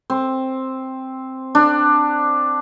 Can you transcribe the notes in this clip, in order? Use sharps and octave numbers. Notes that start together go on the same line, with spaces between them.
C4
D4